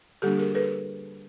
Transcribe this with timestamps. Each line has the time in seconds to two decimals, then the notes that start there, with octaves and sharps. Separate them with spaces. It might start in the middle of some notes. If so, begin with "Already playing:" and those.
0.22 D3 G3 A#3 D4 G4 A4
0.38 G#4 A#4
0.55 A4 B4